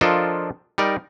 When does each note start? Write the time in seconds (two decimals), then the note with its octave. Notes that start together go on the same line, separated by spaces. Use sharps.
0.01 F3 D4 F4 A4 A#4 D#5
0.78 G3 D#4 A#4 D5